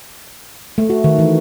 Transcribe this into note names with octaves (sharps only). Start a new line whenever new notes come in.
A3
F#4
D#3
E3